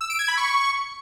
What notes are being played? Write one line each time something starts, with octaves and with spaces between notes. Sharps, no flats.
E6
D7
G#6
B5
C#6